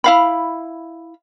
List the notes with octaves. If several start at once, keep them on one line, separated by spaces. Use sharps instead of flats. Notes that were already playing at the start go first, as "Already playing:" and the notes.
E4 F5 B5